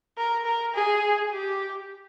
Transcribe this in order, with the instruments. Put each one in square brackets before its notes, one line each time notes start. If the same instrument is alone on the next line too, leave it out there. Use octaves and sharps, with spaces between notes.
[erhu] A#4
A#4
G#4
G4